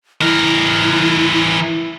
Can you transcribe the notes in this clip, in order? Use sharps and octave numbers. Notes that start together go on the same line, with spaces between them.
E3 E4 A#4